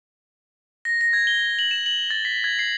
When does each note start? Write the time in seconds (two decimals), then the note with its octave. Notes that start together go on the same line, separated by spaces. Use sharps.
0.85 A#6
1.01 A#6
1.13 G#6
1.27 G7
1.59 F#7
1.71 E7
1.86 F#7
2.11 A6
2.25 B6
2.44 G#6
2.59 C7